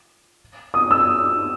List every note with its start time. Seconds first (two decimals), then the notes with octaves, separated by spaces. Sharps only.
0.74 D#6
0.91 E6